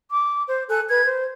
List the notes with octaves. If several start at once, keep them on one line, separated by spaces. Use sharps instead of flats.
D6
C5
A4 G#5 F#6
B4 G#6
C5